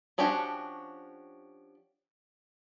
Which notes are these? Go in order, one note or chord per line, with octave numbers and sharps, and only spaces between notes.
F3 C#4 D4 F#4 G4